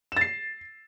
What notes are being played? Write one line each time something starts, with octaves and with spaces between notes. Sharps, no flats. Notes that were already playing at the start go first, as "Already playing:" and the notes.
A6 C7 E7